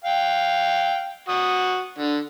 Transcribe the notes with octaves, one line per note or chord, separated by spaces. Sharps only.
F5 G5
F#4 D#6
D3